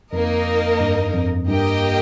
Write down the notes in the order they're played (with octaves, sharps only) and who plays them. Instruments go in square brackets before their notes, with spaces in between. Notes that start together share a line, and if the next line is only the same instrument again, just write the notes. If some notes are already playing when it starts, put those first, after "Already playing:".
[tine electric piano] F2 [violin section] A#3 D#4 A#4 D#5
[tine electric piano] G2
F2
[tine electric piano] G2 [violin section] A#3 G4 A#4 D#5 G5